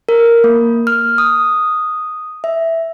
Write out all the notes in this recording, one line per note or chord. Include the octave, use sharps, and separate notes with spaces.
A#4
A#3
F6
D#6
E5